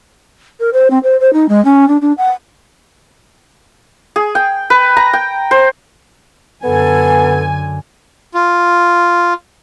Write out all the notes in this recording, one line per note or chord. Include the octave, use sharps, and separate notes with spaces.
A#4
C5
C4
C5
C5
D#4
G#3
C#4
D4
D4
F#5
G#4
G5
B4
A#5
G5
C5
F#2 D3 B3 A4 G#5
F4